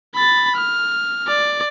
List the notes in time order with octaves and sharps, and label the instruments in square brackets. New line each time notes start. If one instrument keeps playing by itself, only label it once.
[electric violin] B5 A6
F6
D5